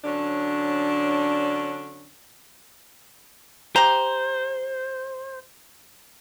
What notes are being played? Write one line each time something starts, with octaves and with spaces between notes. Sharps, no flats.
D3 F#3 C#4 D4
G4 C5 A#5